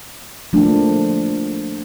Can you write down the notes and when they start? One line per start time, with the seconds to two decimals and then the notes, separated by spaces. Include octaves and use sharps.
0.53 F3 A3 A#3 D4